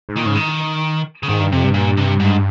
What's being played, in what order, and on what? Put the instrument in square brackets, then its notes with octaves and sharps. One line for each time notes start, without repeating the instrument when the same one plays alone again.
[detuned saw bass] G#2
[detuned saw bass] A#2 [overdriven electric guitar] D#3
[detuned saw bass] G#2 [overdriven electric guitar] C#3
[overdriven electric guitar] D#3
C#3
[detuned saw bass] G#2 [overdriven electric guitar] D#3
[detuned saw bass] G2
[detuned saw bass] F2 [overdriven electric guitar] C3
[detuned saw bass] G2
[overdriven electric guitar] A#2
C3
G#2